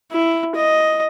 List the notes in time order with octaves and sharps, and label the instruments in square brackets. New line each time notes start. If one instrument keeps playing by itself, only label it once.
[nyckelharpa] E4
D#5